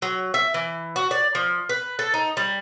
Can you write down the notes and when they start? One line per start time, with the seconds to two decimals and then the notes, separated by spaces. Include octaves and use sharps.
0.02 F#3
0.34 E5
0.54 E3
0.96 F#4
1.11 D5
1.35 F3
1.69 B4
1.99 A4
2.14 D#4
2.37 G3